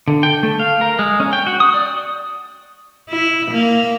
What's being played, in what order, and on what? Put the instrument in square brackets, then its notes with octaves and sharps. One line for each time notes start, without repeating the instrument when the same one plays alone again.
[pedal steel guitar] D3
G5
A3
F5
A#4
G#3
C#4
G5
F#4
D#6
D5
[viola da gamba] E4
A#3